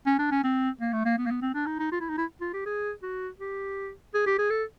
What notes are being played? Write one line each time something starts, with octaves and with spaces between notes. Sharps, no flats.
C#4
D4
C#4
C4
A#3
A3
A#3
B3
A#3
B3
C4
D4
D#4
D#4
F4
E4
D#4
E4
F4
G4
G#4
F#4
G4
G#4
G4
G#4
A4